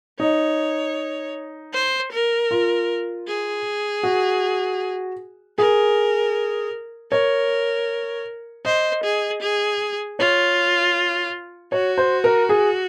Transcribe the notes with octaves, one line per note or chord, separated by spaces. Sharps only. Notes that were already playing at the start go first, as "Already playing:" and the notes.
D#4 C#5
C5
A#4
F4
G#4
F#4
G#4 A#4
A#4 C#5
C5 D#5
G#4
G#4
F4 C#5
F#4 C#5
C5
A#4
G#4